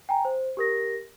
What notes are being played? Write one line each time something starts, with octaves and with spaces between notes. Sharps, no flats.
G5 G#5 A#5
C5
G4 A#4 A#6